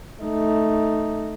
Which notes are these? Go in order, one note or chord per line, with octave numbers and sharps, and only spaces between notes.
A3 D#4